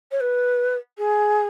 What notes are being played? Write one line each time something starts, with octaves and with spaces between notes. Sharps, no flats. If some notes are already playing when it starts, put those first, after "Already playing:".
C#5
B4
G#4